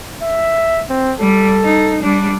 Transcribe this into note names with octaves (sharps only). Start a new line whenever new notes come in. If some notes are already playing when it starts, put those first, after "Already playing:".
E5
C4
G3 A4
D#4
G3 D4